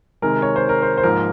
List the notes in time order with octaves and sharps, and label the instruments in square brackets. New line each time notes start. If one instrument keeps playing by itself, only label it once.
[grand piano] C3 D#3 G#3 A#4
C#5
C5
A#4
C5
C5
G#2 F3 A#3 A#4